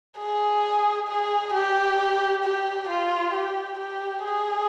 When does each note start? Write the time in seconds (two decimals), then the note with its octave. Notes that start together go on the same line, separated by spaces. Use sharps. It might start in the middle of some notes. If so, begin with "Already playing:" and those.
0.18 G#4
1.08 G#4
1.54 G4
2.44 G4
2.89 F4
3.34 G4
3.79 G4
4.24 G#4